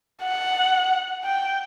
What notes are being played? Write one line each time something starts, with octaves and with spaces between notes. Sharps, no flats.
F#5
G5